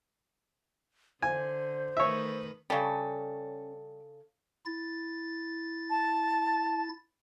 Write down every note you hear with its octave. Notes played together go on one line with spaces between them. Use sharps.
D3 C5 G#5
D#3 A3 B4 C#5 E5
C#3 G3 C#4 A4
E4 A6
A5